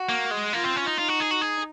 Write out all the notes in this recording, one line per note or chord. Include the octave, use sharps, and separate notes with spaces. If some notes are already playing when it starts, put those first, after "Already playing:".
Already playing: F#4
A#3
G#3
A#3 F4
C4
C#4
D#4
D#4 F4
F#4
G#4
F#4
G#4